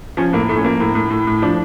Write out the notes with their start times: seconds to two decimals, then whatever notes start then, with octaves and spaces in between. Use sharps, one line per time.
0.17 F3 C#4
0.33 A2 A#3
0.49 A2 A3
0.57 C#4
0.64 F3 A#3
0.80 A2
0.95 A2
1.11 A2
1.27 A2
1.42 F3 D4